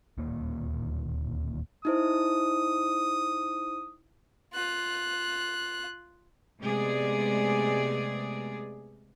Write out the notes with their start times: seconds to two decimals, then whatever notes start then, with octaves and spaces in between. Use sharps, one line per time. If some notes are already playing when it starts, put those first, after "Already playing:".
0.18 D1 D#2 A#2 A#3
1.85 D#4 E4 C5 D#6
4.54 F4 F#6
6.61 C3 G#3 A3 B3 G#4 D5